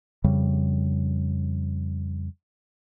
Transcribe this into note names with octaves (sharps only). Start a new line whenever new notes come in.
F2 C#3 G3